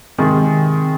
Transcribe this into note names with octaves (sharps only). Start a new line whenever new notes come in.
C3 D#3 G#3